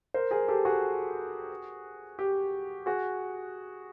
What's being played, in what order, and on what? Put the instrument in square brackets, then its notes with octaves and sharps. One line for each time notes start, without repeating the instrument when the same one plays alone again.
[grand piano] A#4 C5
G#4 A#4
G4 A4
F#4 G#4
G4
F#4 G#4